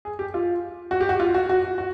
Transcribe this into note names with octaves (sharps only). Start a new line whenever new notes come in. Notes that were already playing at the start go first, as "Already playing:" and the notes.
G#4
G4
F4
F#4
G4
F#4
F4
F#4
F#4
F#4